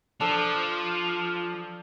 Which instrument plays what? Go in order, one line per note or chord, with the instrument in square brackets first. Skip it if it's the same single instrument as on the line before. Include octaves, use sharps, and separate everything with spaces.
[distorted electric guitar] F3 [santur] D4 A4